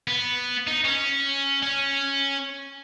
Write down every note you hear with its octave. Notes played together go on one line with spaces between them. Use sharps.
B3
D#4
C#4
C#4